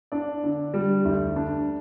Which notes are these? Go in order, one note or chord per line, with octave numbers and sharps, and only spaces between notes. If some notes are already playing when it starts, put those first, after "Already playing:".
D4 D5
D3
G3
D2
D4